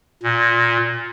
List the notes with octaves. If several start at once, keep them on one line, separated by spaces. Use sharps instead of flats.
A#2